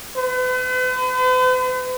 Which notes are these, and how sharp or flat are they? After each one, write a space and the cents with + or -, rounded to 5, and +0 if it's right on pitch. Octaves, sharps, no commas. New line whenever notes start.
B4 +45